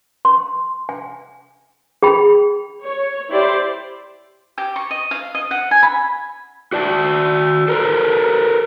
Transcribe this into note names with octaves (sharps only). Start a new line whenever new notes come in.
C6
G#5
G#4 G5 B5
C#5
E4 G4 C5 D5
G4
C#6
D#5
F5
D#5
F#5
G#5
B5
F#4 D5 A5
A4 A#4 C5